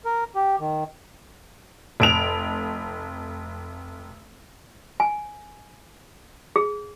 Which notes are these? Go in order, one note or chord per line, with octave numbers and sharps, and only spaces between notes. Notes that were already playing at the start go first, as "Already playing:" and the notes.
A#4
G4
D#3
F1 D7 F7
G#5
G#4